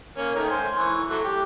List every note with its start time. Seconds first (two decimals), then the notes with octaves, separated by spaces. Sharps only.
0.17 A#3 C#4
0.36 D#3 A3 A#4
0.50 C5 G#5
0.76 E3 C#6
1.09 F#3 A3
1.24 G4